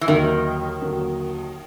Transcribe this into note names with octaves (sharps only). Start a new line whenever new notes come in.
E3
D#2 D3 D#3 F#3 A#3
D#2 D3 F#3 A#3